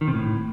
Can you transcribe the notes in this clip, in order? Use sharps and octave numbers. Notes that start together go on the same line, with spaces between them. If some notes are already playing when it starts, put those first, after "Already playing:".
D#3
C3
A2